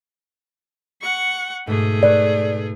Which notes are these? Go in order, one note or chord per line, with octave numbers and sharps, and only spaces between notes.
F#5 C#6
G#2 B2 A3 G#4
B4 C#5 D5